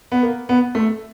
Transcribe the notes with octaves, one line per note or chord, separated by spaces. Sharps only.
B3
A#3
B3
A3